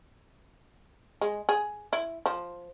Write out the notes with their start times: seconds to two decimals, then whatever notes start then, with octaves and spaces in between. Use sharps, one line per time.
1.21 G#3
1.49 G#4
1.93 E4
2.26 F3